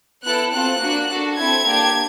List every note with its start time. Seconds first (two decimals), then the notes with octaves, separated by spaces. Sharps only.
0.24 B3 E4 A4 F#6
0.52 C4 F4 A4 F#6
0.80 A#3 D4 F#4
1.09 D4 F#4 A4
1.37 C4 E4 A4 G#6
1.65 A#3 D4 G4